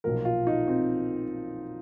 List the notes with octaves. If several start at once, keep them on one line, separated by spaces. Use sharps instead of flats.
B1 A#2 F3 A#4
F4
D#4
C4